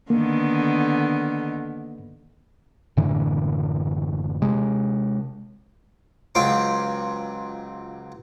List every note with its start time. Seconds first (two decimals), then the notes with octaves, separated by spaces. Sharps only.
0.10 D3 D#3 A#3 B3
2.97 F#1 A2 D3 E3
4.42 C3 G#3
6.35 C#2 F#3 F4 C5 G5 D6